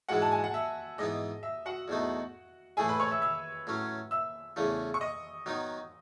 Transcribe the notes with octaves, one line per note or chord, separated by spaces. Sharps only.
G#2 E3 G#3 F#4 F#5
A5
G#5
F#5
E5
G#2 E3 B3 D#5
E5
F#4 F#5
E2 B2 A3 D#4
A2 E3 A3 E4 G#4 G#5
B4 B5
C#5 C#6
E5 E6
E5 E6
A2 F#3 C#4
E5 E6
E2 C#3 E3 A3
C#6
D#5 D#6
D#3 F#3 B3 D#4